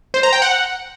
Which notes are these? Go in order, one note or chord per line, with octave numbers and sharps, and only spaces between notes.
C5
A#5
G5
F#5